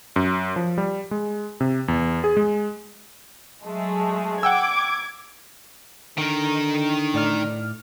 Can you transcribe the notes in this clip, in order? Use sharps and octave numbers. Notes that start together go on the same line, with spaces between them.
F#2
F3
G3
G#3
C3
E2
G#4
G#3
F#3 G#3 A3
F#5 G5 D6 E6 G#6
D3 D#3 A#4
A2 D5 F6